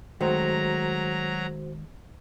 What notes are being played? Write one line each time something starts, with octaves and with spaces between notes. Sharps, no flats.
D#3 F#3 G#3 A3 F#4 C5 A#5